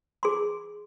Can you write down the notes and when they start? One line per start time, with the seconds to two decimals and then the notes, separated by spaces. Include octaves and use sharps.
0.23 G#4 C6